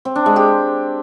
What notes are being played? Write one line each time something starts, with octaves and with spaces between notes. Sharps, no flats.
C4
D4
G#3
G4